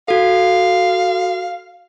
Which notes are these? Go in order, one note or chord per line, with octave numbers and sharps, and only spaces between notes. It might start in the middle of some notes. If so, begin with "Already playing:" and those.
F#4 A4 F5